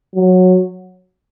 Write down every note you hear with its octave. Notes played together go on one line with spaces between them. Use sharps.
F#3